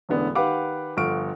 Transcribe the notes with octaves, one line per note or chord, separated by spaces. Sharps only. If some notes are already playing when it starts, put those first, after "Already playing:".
E1 A1 D3 B3 D5
D#3 G4 B4 F5 F#5 D6
G1 F3 F#5 C#6 F6 D7